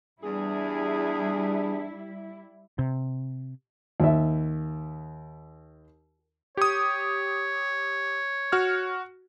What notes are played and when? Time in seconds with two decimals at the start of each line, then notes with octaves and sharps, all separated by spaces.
0.23 E2 G3 D4 E4 G#4
2.79 C3
4.00 D#2 E5
6.57 G4 C#5 D#6
8.52 F#4 F6